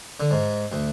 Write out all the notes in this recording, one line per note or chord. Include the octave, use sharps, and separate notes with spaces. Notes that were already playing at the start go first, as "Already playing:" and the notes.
D3
G#2
D2